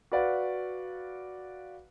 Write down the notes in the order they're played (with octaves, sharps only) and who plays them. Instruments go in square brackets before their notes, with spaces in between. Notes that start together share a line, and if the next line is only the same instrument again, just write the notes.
[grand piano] F#4 B4 D5 F5 F#5